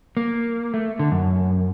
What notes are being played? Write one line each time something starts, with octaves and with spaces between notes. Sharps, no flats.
A#3
A3
D3
F#2